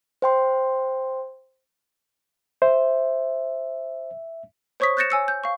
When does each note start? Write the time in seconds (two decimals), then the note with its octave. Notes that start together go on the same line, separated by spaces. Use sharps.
0.22 C5 G5 C6
2.62 C5 E5
4.80 C5 C#5 C#6 D#6 B6
4.97 F#6 G6 A6 A#6 C#7 E7
5.10 C#5 G#5 E6 C#7
5.28 G6
5.44 F5 C#6